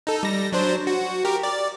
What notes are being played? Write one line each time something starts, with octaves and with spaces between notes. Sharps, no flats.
D#4 A4
G3 A#6
F#3 D4 C5
F#4
G4 A#4
D5